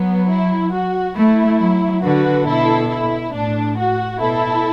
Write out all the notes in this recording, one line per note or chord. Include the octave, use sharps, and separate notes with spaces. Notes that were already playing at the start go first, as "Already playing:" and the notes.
Already playing: F#3 B3
E4
F#4
A3 E4
F#3
D3 F#4 B4
B2 E4 A4
E4
A2 D4
F#4
B2 E4 A4